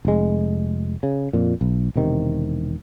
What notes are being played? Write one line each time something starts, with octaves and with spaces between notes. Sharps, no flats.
F1 G#3
C#3
F2 A#2
B1
E1 C3 D#3